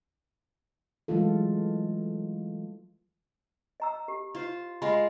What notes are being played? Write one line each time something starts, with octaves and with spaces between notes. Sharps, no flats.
E3 F#3 G#3 A3 F4 A4
D#5 A#5 E6
G4
F4 C5
G#3 F4 A#4 B5